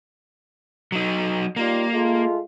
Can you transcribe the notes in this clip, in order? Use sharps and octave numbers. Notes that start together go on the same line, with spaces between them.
F#3 D#4
G3 A#3 D#4 F4
G#3 A3 F4